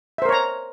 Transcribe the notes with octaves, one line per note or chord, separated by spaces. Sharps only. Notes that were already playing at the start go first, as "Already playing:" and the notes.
A#4 C5 C#5 E5 A#5